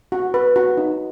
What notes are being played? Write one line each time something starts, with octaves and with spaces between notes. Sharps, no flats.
F#4
B4
F#4
D#4